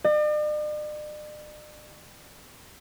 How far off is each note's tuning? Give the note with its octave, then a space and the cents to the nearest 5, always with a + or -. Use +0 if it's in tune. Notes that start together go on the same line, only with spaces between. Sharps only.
D5 +45